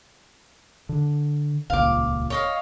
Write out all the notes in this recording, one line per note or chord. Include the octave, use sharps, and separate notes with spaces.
D3
D#1 C#2 A#2 F5 D6
C#5 D#5 F5